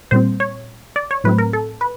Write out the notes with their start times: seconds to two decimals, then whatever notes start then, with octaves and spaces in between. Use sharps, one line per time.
0.11 A#2 G3 C4 C5
0.40 C#5
0.96 D5
1.11 C#5
1.24 A2 F#3 A3 C4 B4
1.38 A#4
1.53 A4
1.81 B4